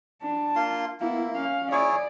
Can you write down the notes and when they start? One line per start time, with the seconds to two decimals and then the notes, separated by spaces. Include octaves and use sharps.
0.22 D4 A5
0.56 A#3 F4 C6
1.00 A#3 B3 E4
1.33 C#4 F5
1.72 E4 G#4 C#5 D5